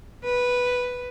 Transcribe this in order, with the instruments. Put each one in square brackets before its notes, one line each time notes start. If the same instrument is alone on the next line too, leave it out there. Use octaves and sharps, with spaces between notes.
[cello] B4